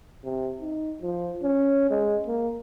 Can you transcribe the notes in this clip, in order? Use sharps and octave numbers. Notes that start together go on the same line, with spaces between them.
C3
D#4
F3
C#4
G#3
A#3